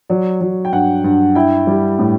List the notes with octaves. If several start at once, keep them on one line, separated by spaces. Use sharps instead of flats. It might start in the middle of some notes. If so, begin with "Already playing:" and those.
F#3 D5
F#3
G5
G2 F#5
G2
E4 G5
G3
A2